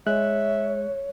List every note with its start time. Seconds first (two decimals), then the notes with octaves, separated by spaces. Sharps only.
0.07 G#3 C#5 E5 F#6